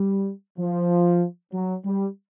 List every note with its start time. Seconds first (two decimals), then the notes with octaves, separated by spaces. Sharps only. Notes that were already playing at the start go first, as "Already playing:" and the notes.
Already playing: G3
0.58 F3
1.53 F#3
1.84 G3